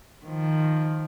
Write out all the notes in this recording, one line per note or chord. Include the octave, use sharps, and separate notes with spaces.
D#3 F3